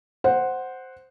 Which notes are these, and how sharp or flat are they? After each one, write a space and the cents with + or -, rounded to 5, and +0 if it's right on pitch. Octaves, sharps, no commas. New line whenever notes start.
C5 +0 F#5 +0